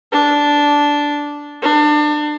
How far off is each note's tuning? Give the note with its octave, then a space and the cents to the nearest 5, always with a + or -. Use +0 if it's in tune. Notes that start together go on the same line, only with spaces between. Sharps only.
D4 -10
D4 +30